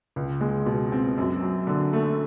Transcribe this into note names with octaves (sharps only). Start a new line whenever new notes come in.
C#2
G#3
B2
C4
F#2
F#3
D3
A3